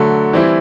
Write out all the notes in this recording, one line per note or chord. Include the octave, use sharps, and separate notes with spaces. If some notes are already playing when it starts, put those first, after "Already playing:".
Already playing: D3 F#3 A3
E3 G3 C4 E4